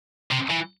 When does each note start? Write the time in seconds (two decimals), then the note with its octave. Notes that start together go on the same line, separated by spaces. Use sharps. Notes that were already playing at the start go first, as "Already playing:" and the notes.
0.31 C3
0.51 E3